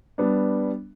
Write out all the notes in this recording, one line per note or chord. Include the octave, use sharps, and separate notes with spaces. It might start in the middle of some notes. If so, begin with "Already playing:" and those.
G3 B3 D4